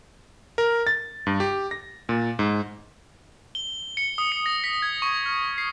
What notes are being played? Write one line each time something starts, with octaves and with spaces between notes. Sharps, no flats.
A#4
A6
G2
G4
A#6
A#2
G#2
G7
C#7
D#6
C#7
A#6
B6
G#6
C#6
F6
C7